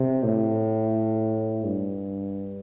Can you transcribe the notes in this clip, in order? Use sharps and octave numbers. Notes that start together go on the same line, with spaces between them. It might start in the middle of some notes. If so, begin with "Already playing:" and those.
Already playing: C3
A2
G2